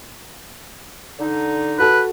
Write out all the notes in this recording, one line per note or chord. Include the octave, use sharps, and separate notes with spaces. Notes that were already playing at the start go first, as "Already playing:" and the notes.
D3 D#4
F#4 A4 B4